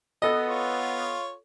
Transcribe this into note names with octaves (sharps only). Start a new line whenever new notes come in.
B3 A4 D#5
F4 C#5